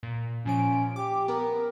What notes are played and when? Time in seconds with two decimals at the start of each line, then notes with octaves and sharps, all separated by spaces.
0.03 A#2
0.46 A#2 F3 C#4 D7
0.96 G4 D6
1.28 B3 A#4